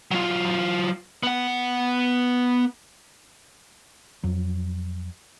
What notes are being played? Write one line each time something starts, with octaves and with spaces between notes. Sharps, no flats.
F#3 F4
B3 F#5
F2 F#3